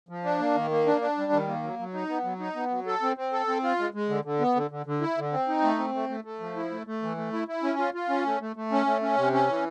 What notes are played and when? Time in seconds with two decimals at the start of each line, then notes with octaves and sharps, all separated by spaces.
0.09 F3
0.24 D4
0.39 A#3
0.55 D#3
0.71 A#3
0.86 D4
1.01 D4
1.18 G3
1.32 D#3
1.48 A#3
1.63 F#3
1.79 F#3
1.94 D#4
2.09 B3
2.24 F#3
2.40 D#4
2.55 B3
2.71 F#3
2.87 A4
3.02 C4
3.17 C4
3.33 A4
3.48 C4
3.63 F4
3.79 G#3
3.94 G#3
4.09 D3
4.25 D3
4.40 B3
4.56 D3
4.71 D3
4.86 D3
5.01 E4
5.18 D3
5.32 C4
5.48 D#4
5.63 A3
5.78 C4
5.95 A3
6.09 A3
6.24 A3
6.40 F3
6.56 E4
6.71 A3
6.87 A3
7.03 E3
7.17 A3
7.33 E4
7.48 E4
7.63 C#4
7.79 F4
7.94 F4
8.09 C#4
8.26 A3
8.41 A3
8.56 A3
8.72 C#4
8.86 A3
9.02 C#4
9.17 C3
9.33 C#4
9.48 E3